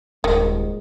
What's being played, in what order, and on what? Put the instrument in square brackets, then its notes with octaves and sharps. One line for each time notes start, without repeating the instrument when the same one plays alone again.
[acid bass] D#1 [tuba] G#2 [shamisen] D#3